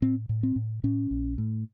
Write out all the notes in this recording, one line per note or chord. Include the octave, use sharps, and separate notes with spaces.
A2 C4
A2
C4
A2
A2 C#4
A#1
A2